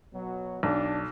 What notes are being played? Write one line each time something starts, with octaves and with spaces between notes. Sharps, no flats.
B2 F#3
B1 D4